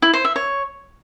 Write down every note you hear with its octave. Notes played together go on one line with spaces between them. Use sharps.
E4
C5
E5
C#5